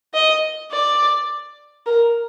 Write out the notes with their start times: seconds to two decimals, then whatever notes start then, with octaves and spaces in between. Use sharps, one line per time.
0.14 D#5
0.71 D5
1.86 A#4